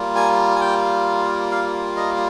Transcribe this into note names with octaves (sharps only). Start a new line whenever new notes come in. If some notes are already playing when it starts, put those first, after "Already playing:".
Already playing: G3 A#3 F4
G#5
G#5
G5
F5
D#5